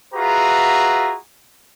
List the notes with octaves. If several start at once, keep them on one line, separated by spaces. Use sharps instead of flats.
F4 F#4 G#4 B4 E5 A#5